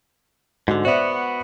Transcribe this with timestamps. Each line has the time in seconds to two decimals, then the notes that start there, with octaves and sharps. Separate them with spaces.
0.68 G#2 D3 F#4
0.85 B3 F#4 C5 D5 E5